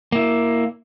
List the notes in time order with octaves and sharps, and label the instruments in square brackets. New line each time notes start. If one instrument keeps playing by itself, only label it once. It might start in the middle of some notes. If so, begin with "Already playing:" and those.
[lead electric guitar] A#3 E4